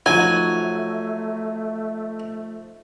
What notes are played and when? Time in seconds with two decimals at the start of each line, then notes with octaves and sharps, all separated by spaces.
0.06 F3 F#3 A3 D#4 G#5